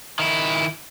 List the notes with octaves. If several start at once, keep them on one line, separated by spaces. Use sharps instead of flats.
D#3 E4